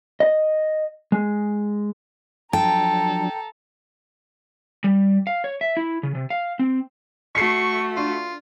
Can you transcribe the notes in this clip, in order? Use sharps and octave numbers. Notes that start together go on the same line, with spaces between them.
D#5
G#3
F3 F#3 D4 A4 G5 A5 A#5
G3
F5
C#5
E5
E4
C#3
C3
F5
C4
A3 F#4 C#6 B6 C7
D4 F4